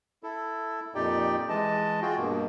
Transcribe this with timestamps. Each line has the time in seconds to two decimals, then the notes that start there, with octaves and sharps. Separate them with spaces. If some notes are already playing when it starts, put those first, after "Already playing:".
0.23 E4 A4
0.95 F2 A#2 D#4 G4 D5 G5
1.49 E3 G#3 D#5 A5
2.02 F4 F#4 G#4 G5
2.17 G2 B2 A#3